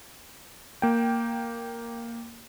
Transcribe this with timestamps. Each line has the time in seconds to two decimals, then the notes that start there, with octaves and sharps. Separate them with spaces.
0.82 A#3 G5